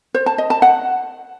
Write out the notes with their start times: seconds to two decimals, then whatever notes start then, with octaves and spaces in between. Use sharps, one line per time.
0.14 C5
0.26 A5
0.38 D#5
0.50 A5
0.62 F#5